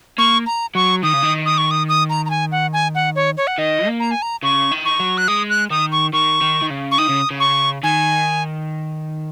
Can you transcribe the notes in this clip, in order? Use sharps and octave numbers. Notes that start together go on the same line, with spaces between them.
A#3 C#6
A#5
F#3 C#6
D#3 D#6
C#3
D#3
D#6
C#6
D#6
D#6
A#5
A#5
G#5
F#5
G#5
F#5
C#5
C#5
F#5
D#3 D#5
A#3
A#5
G#5
A#5
C#3 C#6
D#3
C#6
F#3
F#6
G#3 D#6
F#6
D#3 D#6
C#6
D#3 C#6
D#3
D#3
C#3
C#6
D#3 D#6
C#3
C#3
C#6
D#3 G#5